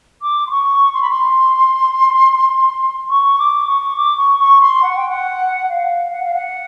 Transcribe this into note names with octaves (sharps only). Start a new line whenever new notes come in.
D6
C6
C#6
C6
B5
C6
C#6
D6
C#6
D6
C#6
C#6
C6
F#5
G5
F#5
F5
F#5
F5
F#5